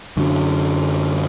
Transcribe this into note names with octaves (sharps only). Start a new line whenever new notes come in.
F#2 D3 F#3